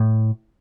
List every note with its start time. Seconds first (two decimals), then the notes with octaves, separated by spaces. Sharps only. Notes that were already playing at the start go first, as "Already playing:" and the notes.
Already playing: A2